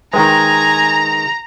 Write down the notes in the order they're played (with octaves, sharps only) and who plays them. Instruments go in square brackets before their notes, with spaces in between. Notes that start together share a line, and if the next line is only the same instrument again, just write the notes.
[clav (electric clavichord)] D#3 G#3 [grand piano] B4 G5 [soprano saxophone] G#5 [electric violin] A#5